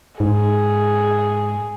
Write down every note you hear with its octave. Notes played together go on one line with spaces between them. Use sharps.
G#2 G#4